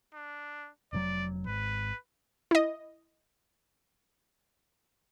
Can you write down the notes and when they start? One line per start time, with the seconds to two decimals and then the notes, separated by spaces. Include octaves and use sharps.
0.14 D4
0.93 F1 C3 F#3 D5
1.47 G#1 B4
2.51 E4 D#5